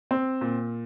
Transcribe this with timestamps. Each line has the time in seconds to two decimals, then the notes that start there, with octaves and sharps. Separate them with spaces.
0.11 C4
0.41 A#2